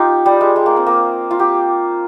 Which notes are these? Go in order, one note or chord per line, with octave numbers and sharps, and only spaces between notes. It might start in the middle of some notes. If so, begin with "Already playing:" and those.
Already playing: D#4 F4 G4
G3
G#3
G#3
A#3
C4
A#3
F4
G4